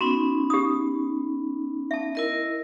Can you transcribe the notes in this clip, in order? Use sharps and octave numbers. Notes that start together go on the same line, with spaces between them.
B3 C#4 D#4 F#4
G4 D#6
E5 A5
E4 A#4 D#5